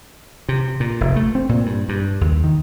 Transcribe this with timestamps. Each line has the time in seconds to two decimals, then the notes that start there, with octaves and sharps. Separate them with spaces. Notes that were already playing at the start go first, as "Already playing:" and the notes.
0.49 C3
0.80 A#2
1.01 F1
1.16 A3
1.35 C4
1.49 A#2
1.66 G2
1.89 G2
2.21 D#2
2.44 D#3